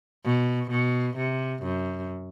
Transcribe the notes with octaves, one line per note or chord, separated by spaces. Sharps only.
B2
B2
C3
F#2